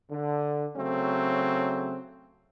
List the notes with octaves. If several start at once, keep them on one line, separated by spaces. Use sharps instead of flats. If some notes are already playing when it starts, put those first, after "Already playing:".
D3
C#3 F#3 A3 C4